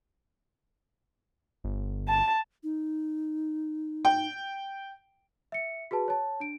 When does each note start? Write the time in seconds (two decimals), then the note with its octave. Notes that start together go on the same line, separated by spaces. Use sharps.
1.64 G1
2.08 A5
2.63 D#4
4.05 G5
5.52 E5 C#7
5.91 F#4 G#4 B4 A5
6.08 C#5 A5
6.40 D4 D7